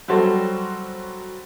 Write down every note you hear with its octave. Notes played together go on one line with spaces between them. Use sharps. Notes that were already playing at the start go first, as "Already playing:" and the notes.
F#3 G3 F#4 A4 C5